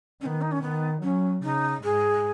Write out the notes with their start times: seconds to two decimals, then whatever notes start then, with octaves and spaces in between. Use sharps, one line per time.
0.21 D#3 B3 C#4
0.41 D#4
0.52 C#4
0.62 D#3 B3
1.02 F#3 C#4
1.43 C#3 D#4
1.83 G#2 G#4